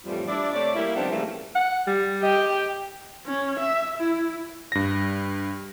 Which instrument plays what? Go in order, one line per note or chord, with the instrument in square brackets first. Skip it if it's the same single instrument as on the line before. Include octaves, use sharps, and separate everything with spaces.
[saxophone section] F2 A2 E3 F3 G3
D4 E4 D5
C3 A3 C#5 D5
G3 A#3 E4
D#3 F3 G3 B3 C4 D4
A2 C#3 E3 G3 A3 A#3
[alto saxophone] F#5
G3
[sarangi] G4 [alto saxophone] D#5
[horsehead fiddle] C#4
E5
E4
[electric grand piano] G2 A#6